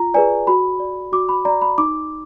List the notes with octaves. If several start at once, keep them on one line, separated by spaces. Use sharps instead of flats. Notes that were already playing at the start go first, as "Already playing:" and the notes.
Already playing: F4 A#5
G#4 B4 D5 G#5
F#4 B5
D5
F#4 D6
B5
D5 A#5
B5
D#4 D6